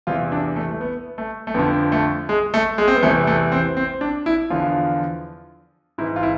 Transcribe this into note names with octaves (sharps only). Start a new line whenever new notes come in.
E2 C3 E3 F4
D4
A3
A3
B3
A3
A3
F2 D3 F3 B3
A3
G#3
A3
G#3
C4
B3
E2 C3 E3 A3
A3
C4
C4
D4
E4
E2 D3 F3 F4
G#2 E3 E4
F4
E4